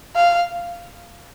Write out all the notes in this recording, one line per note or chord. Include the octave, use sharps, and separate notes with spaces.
F5